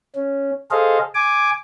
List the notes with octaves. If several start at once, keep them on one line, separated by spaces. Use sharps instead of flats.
C#4
G#4 A4 C5 D#5 F5
G#5 D6